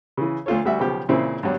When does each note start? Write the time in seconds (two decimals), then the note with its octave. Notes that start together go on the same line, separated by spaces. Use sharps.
0.17 C#3 E3
0.46 D2 A3 F4 A4 C#5
0.65 D2 G3 F#4 E5
0.80 B1 C#3 F3 G4
1.09 A#2 C#3 E3 C4 E4
1.43 G2 F#3 G3